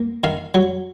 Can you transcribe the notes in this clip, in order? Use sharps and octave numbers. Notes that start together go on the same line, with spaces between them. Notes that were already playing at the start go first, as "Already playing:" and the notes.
Already playing: A#3
D#3 F5
F#3